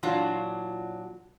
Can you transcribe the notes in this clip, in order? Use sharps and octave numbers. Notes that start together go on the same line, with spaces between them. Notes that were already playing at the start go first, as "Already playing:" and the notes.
A#2 E3 F#3 D4 F4 F#4